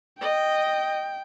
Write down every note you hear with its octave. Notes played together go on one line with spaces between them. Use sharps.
D#5 G5